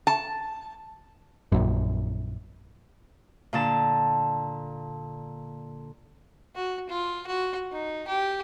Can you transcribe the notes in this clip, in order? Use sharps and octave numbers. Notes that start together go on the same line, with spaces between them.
A5
A#1 F#2
A#2 D3 A5
F#4
F4
F#4
D#4
G4